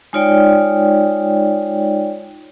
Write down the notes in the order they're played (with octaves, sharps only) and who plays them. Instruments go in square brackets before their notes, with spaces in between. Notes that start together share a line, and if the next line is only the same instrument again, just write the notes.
[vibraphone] G#3 D#4 F4 C#5 D5 G5